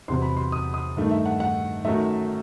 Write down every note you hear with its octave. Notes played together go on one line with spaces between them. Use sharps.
E2 C3 F#3 C6
B5
C6
D#6
D#6
G2 D#3 A3 D#4
E5
F#5
F#5
F#2 D#3 F#3 A3 D#4 E5